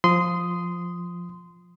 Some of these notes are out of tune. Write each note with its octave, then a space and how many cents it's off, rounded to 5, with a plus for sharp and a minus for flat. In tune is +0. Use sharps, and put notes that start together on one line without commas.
F3 +0 C6 -20 D#6 +0